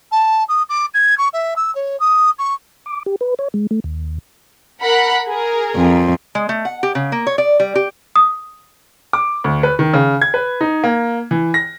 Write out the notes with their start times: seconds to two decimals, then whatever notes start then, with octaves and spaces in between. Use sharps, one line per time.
0.11 A5
0.48 D#6
0.69 D6
0.94 G#6
1.18 C#6
1.33 E5
1.56 E6
1.75 C#5
1.99 D#6
2.38 C#6
2.86 D6
3.06 G4
3.21 B4
3.39 C#5
3.54 G#3
3.71 A3
3.84 D#2
4.81 A#4 F#5 B5
5.28 G#4 A#4
5.76 F2
6.35 G#3
6.49 A3
6.65 F#5
6.83 G4
6.95 C#3
7.12 A#3
7.27 C#5
7.38 D5
7.60 G3
7.75 G4
8.16 D#6
9.13 D6
9.44 D2
9.63 B4
9.79 D#3
9.94 C#3
10.21 G#6
10.34 B4
10.61 D#4
10.84 A#3
11.31 E3
11.54 A#6